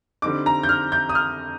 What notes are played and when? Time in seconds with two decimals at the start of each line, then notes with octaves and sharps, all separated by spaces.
0.22 D3 G3 C4 D#4 D6
0.46 A#5
0.63 G6
0.69 F6
0.92 G6
1.09 D#6
1.15 F6